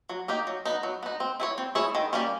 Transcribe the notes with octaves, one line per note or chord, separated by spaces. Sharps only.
F#3
A#3 D#4 G4
F#3
B3 D#4
F#3
B3 D#4
C4
E4 G#4 C#5
C4
E4 G#4 C#5
D#3
G3 A#3 C#4